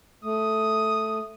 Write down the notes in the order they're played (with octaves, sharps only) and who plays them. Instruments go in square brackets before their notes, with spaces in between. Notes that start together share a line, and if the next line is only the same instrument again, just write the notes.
[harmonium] A3 [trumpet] D#6